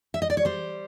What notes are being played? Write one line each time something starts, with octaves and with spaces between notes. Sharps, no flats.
E5
D#5
D5
C#5
G3 C5